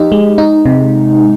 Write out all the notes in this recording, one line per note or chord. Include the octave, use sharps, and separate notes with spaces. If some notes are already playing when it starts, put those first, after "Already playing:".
Already playing: F3 D#4 G4
G#3
D#4
C3